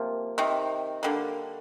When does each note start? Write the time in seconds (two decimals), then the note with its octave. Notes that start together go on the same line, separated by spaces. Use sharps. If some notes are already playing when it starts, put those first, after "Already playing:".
Already playing: C3 F3 A#3
0.38 C3 D#3
1.03 D3 G3 A#3